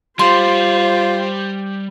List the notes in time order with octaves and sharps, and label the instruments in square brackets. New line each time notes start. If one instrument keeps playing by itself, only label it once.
[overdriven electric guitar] G3 [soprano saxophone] F4 [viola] C5 [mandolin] C6